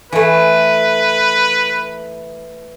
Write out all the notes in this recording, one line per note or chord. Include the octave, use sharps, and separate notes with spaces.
E3 A3 B4